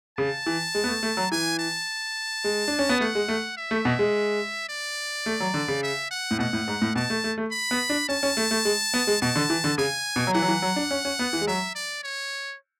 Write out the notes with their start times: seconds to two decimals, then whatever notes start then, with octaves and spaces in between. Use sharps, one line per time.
0.18 C#3 A5
0.46 E3
0.75 G#3
0.84 B3
0.88 A3
1.03 A3
1.17 F#3
1.32 E3 G#5
1.59 A5
2.44 G#3
2.68 D4
2.79 C#4
2.89 B3
3.00 A3 F#5
3.15 G#3
3.28 A3
3.58 E5
3.71 A3
3.85 B2
3.99 G#3
4.69 D5
5.26 A3
5.40 F#3
5.54 D3
5.68 C#3
5.83 E5
6.11 F#5
6.31 A2
6.39 B2 F#5
6.53 A2
6.68 G#2
6.82 A2
6.96 B2 A5
7.10 A3
7.24 A3
7.38 A3
7.52 B5
7.71 B3
7.89 D4
8.09 C#4 A5
8.23 C#4
8.37 A3
8.51 A3
8.65 G#3
8.94 B3
9.07 G#3
9.22 B2 A5
9.36 D3
9.50 E3
9.64 D3
9.78 C#3 G#5
10.16 B2
10.27 F#3
10.34 E3 F#5
10.42 F#3
10.48 E3
10.62 F#3
10.76 D4
10.91 C#4
11.05 C#4
11.19 B3
11.33 E3
11.41 G#3
11.47 F#3 E5
11.76 D5
12.04 C#5